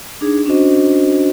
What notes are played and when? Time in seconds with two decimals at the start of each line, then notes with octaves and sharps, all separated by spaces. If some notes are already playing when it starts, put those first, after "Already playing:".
0.21 D4 D#4 G#4
0.46 C#4 D4 F#4 C5 D#5